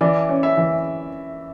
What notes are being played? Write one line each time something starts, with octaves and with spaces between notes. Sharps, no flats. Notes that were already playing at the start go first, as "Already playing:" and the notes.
E3 D5
C#4
E5
E3